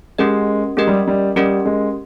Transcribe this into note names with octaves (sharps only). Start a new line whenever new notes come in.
G#3 C#4 G4 A#4 D#5
G#3 C#4 G4 A#4 D#5
G3
G3
G3 C#4 G4 A#4 D#5
G#3